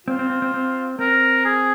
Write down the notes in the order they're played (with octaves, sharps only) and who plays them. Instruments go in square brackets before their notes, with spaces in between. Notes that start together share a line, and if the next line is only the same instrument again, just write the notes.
[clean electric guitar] C4 [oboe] F4
[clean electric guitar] C4
C4
C4
C4
[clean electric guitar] C4 [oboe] A#4
[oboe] G#4